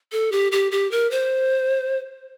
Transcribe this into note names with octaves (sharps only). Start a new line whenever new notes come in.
A4
G4
G4
G4
A#4
C5